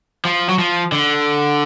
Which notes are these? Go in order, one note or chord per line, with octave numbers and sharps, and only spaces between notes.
F3
F#3
F3
D3